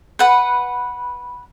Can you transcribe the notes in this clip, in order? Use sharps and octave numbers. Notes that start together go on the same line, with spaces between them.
B4 F#5